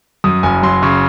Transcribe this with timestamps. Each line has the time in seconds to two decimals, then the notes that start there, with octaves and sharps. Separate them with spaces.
0.24 F#2 D#6
0.43 F#1 G#5
0.63 F#3 C6
0.82 C#3 C#6